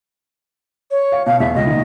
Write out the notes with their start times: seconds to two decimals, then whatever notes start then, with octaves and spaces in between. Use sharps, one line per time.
0.91 C#5
1.12 F5
1.26 B2 F5
1.40 E2 E5
1.55 C#2 D#5
1.67 A#1 D#3